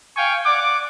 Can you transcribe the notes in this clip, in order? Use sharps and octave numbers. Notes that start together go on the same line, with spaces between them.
F5 G5 G#5 C#6
D5 F#5 D6